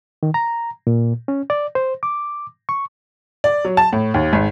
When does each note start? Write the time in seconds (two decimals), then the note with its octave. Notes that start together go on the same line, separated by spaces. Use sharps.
0.23 D#3
0.34 A#5
0.87 A#2
1.28 C#4
1.50 D5
1.75 C5
2.03 D6
2.69 C#6
3.44 D5
3.65 F#3
3.77 A5
3.93 A2
4.14 D#2
4.33 G#1